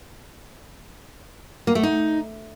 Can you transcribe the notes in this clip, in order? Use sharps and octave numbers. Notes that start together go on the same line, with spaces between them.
A#3
A3
D#4